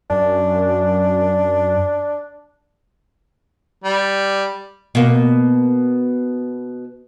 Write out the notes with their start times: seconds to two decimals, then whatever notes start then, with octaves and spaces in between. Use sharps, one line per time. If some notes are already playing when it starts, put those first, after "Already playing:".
0.10 F#2 D4
3.84 G3
4.95 B2 A#3